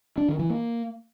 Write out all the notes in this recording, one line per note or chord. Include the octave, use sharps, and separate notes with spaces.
D4
D#3
E3
A#3